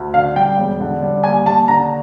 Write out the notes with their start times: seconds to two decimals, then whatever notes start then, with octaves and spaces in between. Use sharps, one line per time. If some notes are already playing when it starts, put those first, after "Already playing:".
Already playing: D2
0.14 D3 F5
0.35 G3 G5
0.58 E1
0.80 D3
1.02 G3
1.23 D#2 G#5
1.46 D#2 A5
1.68 D3 A#5